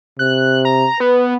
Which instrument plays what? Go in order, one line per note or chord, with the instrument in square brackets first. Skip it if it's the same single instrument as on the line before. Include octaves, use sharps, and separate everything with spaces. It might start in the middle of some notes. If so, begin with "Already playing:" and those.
[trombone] C3 [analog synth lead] F#6
[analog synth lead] A#5
[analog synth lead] B3 [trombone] B4